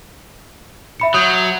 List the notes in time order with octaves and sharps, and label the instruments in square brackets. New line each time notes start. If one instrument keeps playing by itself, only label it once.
[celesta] E5 B5 C#7
[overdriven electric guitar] F#3 [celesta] D#6 G6